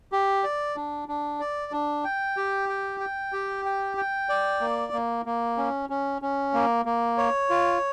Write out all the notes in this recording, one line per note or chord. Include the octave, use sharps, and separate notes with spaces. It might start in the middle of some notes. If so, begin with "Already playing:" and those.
G4
D5
D4
D4
D5
D4
G5
G4
G5
G5
G4
G5
G5
D5
A#3
A#3
A#3
C#4
C#4
C#4
A#3
A#3
C#5
F4